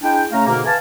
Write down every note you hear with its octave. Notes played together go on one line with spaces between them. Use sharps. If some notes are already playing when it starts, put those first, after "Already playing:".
G#3 D4 E4 G5
C#3 A3 C#4 F5 A#5
G#2 B2 D3 A#3
B4 E5 F5 G#5 A5